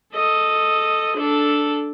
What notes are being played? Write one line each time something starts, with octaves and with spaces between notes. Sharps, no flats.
A4 D#5
D4 A4